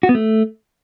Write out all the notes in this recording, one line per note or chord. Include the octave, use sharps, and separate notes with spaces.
F#4
B3
A3